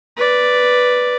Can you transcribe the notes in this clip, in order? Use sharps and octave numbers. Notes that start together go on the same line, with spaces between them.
B4 D5